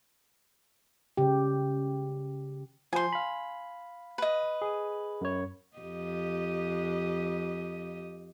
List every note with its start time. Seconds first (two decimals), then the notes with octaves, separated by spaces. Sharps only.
1.17 C#3 G4
2.93 F3 C5 G#5 C6
3.13 F5 B5
4.18 B4 D#5
4.62 G#4
5.21 F#2 C#5
5.77 F2 G4 D#5